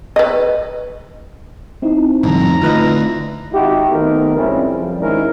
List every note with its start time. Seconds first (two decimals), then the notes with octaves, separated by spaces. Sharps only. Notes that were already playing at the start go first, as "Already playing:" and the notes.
0.16 B4 D#5
1.82 C4 D#4 E4
2.23 F2 A2 D3 G3 A#5
2.62 D3 A3 F4 B4 D#5
3.53 G#1 D#4 E4 F#4 G4
3.89 D#3 A3 B3 C4 D#4 A#4
4.35 C#2 F#2 C#3 G3 C4 E4
4.69 F2 G3
5.00 G#2 D#3 G#3 C#4 E4 A#4